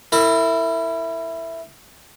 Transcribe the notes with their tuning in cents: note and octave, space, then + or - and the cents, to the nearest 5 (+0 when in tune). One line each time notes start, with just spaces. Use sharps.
E4 +0 A#4 -45